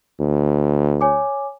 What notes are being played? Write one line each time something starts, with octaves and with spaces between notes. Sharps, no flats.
D2
C#5 G#5 D6